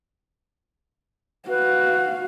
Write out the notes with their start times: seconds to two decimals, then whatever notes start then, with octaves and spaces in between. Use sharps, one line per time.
1.49 F#4 B4 F5